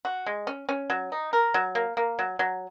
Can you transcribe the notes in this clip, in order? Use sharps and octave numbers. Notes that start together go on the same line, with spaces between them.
F#4
G#3
C#4
C#4
F#3
D#4
A#4
F#3
A#3
A#3
F#3
F#3